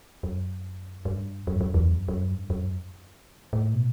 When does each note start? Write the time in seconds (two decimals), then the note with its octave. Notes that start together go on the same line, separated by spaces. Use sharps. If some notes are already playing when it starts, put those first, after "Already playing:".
0.23 F#2
1.05 G2
1.47 F#2
1.55 G2
1.61 F#2
1.74 E2
1.88 F#2
2.08 F#2
2.30 G2
2.50 F#2
3.53 A2
3.74 B2